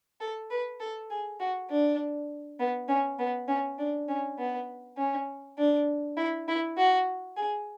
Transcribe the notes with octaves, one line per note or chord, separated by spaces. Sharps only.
A4
B4
A4
G#4
F#4
D4
B3
C#4
B3
C#4
D4
C#4
B3
C#4
D4
E4
E4
F#4
G#4